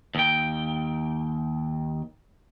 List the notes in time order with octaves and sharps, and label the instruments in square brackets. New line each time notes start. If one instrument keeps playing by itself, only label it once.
[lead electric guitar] D#2 G5